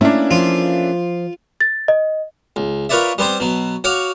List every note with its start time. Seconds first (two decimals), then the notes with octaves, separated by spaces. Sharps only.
0.01 A3 A#3 C#4 D4 E4
0.31 F3 F4
1.61 A6
1.88 D#5
2.56 C#2
2.89 F4 A#4 B4 C#5 D5 E5
3.18 G3 B3 C4 C5
3.40 B2 F#3
3.84 F#4 C#5 F5 F#5 D6